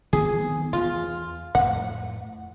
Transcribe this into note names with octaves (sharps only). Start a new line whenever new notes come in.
D#3 B3 C4 G#4
E2 F4
F2 A2 F#5